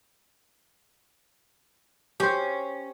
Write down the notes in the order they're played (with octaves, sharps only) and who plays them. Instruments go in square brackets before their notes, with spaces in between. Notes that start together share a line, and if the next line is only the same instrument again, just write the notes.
[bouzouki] C#4 [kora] G4 C5